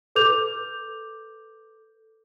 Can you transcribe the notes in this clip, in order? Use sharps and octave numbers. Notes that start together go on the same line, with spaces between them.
A4 B4 D6 G6 F7